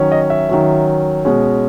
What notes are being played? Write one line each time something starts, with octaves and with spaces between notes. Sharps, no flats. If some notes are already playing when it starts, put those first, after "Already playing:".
Already playing: D#3 F#3 C#4
D#5
E5
D#3 F#3 C#4
B2 G#3 C#4